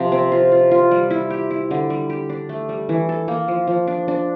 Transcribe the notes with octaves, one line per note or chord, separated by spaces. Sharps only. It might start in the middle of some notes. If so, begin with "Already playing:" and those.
Already playing: C3 F3
C4
F4
F4
F4
G3
E4
G4
E4
D3
G3
G4
D4
A3
G3
E3
A4
A#3
F3
F3
D4
D4